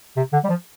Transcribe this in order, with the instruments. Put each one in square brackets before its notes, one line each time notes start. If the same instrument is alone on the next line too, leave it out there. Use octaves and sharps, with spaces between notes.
[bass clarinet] C3
D3
G3
F3